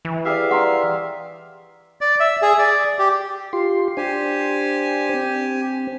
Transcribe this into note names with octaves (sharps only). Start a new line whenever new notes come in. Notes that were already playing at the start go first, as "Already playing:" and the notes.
E3
G4 G#4 D5 E5 F5
C5 F#5 A#5 C6 D6
D5
E5
G#4
D5
G4
F4 G4 C6
D4 G4 C5 G#5
C4